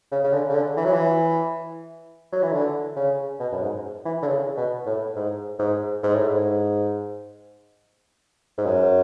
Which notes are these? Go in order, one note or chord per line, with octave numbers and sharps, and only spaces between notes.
C#3
C#3
D3
C#3
D3
E3
F#3
E3
F#3
E3
D3
C#3
B2
F#2
G#2
E3
D3
C#3
B2
A2
G#2
G#2
G#2
A2
G#2
G#2
F#2